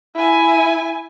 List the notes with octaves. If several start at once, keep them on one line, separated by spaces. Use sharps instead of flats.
E4 G#5